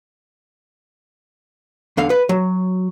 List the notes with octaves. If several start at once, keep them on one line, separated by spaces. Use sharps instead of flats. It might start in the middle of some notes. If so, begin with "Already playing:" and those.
E2 D3 F5
B4
F#3